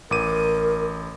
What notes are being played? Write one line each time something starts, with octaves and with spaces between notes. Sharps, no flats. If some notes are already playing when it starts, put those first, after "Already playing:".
A1 A#4 D6 D#7